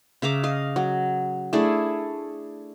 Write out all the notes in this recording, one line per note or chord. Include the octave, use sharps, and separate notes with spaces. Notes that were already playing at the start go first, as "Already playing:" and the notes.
C#3 E5 A#5 D6
D#5 F5
F#3
A3 D4 E4 G#4